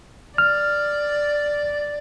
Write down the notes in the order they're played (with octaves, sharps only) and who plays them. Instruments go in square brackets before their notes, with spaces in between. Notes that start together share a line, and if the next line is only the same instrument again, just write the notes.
[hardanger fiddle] D5 [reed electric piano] F6